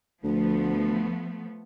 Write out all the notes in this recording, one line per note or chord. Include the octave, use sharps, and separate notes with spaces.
D2 F3 A3 B3